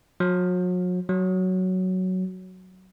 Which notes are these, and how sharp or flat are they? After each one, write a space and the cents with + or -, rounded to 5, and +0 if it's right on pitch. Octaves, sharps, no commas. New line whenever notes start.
F#3 -40
F#3 +5